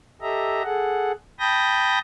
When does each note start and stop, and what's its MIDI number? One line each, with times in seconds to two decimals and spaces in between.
0.22 0.63 67
0.22 0.63 69
0.22 0.63 75
0.22 0.63 76
0.22 0.63 82
0.64 1.12 68
0.64 1.12 69
0.64 1.12 78
1.39 1.99 79
1.39 1.99 81
1.39 1.99 83
1.39 1.99 87
1.39 1.99 91
1.39 1.99 94